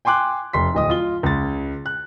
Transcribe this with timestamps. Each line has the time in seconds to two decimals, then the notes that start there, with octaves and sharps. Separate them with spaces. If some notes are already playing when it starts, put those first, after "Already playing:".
0.05 G5 G#5 C6 D6 F#6
0.53 F1 C6 B6
0.75 D1 D#5 D#6
0.90 F4 G7
1.23 C#2 A6
1.86 F#6